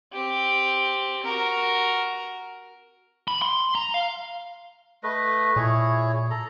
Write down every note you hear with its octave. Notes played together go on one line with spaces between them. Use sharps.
C4 G4
F#4 A#4
B5
C6
A#5
F5
A3 B4 D#5
A#2 E4 G#4 C#5
A4 A#5